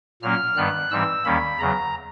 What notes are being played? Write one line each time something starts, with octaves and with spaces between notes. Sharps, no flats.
A#2 F#3 A#3 C#4 F6
G2 D#3 G3 B3 F#6
G#2 E3 G3 C4 E6
D#2 D#3 G3 A#3 C#4 B5
E2 C#3 F#3 A#5